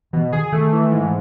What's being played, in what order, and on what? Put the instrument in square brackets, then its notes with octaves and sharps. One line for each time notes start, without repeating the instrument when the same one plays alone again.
[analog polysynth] B2 [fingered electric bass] E3
[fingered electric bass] D#3 [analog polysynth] G#4
[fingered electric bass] D#3 [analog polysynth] A3
[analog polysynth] E3
G#2